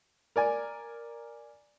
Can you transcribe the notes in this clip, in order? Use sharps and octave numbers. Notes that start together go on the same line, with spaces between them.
A#4 D5 G#5